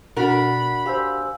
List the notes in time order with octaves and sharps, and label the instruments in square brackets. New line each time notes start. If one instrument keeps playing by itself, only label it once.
[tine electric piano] B2 [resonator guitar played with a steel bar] D4 F#4 A#4 [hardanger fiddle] B5
[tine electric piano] G4 C5 [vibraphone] F5 G#5 E6